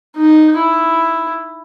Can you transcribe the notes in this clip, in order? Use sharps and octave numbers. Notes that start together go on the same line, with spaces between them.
D#4
E4